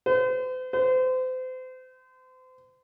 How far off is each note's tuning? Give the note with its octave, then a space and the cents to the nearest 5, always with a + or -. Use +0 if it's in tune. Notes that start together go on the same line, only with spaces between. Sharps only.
C5 -45
C5 -35